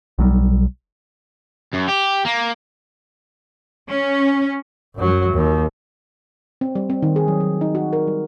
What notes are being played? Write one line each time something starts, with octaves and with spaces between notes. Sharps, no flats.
B1 F#3 G3
F#2
G4
A#3
C#4
F#2 F#3
D#2
C4
G3
C4
D#3
G#4
F#3
F#3
D#4
F#4
A#4
G3